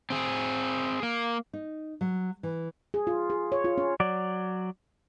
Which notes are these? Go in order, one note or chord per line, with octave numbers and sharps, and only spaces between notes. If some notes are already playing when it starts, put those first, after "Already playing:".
C4 G#4
A#3
D#4
F#3
E3
G#4
F4
G#4
C#5
F4
C#4
F#3 D5